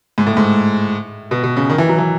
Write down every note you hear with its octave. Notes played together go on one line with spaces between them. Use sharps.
G#2
A2
G#2
B2
B2
C#3
D#3
E3
F#3
E3